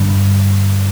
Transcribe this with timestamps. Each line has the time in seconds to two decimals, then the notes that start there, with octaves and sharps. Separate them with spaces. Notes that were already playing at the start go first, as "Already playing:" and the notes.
Already playing: G2 D3